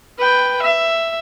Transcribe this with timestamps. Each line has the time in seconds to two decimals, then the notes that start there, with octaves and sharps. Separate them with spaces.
0.18 B4 G5
0.62 E5